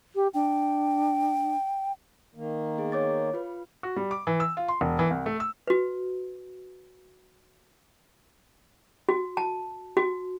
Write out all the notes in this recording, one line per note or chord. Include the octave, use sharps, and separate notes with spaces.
G4
D4 G5
D#3 A#3
B3 G#4
C#5 D6 A6
F4 B4
F#4
G3
D6
E3
E6
F4
C6
E1
E3
C2
A3
E6
F#4 B4
F#4
A5
F#4